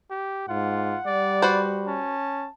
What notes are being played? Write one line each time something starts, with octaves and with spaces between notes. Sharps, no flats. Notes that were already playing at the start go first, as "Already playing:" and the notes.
G4
G#2 F4 F#5
G3 D5
F#4 B4 C5
C#4 A5